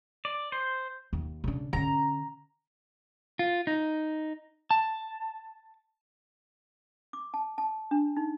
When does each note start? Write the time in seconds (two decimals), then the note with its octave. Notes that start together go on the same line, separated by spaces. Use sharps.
0.25 D5
0.52 C5
1.13 D#2
1.44 C#3 D4
1.73 D3 C#4 A#5
3.39 F4
3.67 D#4
4.71 A5
7.13 D6
7.34 A5
7.58 A5
7.91 D4
8.17 D#4